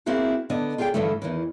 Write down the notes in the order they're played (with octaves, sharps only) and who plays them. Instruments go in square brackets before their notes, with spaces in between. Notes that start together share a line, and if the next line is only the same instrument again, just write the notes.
[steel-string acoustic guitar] A#3 C4 E4 F#4 G#4
D3 B3 D4 D#5
F4 G4 G#4 D5 G5
G2 D3 E3 F3 A3
E2 G2 D#3 E3